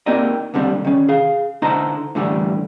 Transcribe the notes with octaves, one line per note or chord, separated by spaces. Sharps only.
A#3 C4 D#4 G4 D5 D#5
D#2 D3 G3 C4
D#3 C#4
G#4 F5
D3 D#4 E4 C5 A5 A#5
A2 D3 E3 G3